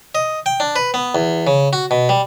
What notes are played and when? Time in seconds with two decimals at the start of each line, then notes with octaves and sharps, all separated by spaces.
0.15 D#5
0.46 G5
0.60 D4
0.76 B4
0.94 B3
1.15 E2
1.47 C#3
1.73 F#4
1.91 B2
2.09 G3